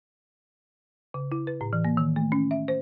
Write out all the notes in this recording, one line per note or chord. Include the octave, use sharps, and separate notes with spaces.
C#3
E4
B4
A2
E3
A#3
D#3
A3
C#4
E5
C5